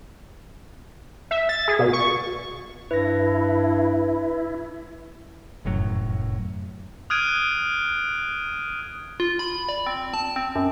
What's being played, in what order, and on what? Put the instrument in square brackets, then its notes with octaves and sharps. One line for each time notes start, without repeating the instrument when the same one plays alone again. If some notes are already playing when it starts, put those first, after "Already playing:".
[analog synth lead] E5
A6
G#4
B2
C#6
[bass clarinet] G2 [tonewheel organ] E4 [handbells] B4 A#6
[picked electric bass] F1 F#2 A2 F#3
[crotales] D#6 F6 F#6 G#6 D7 D#7
[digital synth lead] F4
B5
D5
C4
A5
C4
F#2